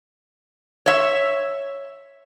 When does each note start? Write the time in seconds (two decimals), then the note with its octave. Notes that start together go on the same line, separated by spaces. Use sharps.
0.86 C#5 E5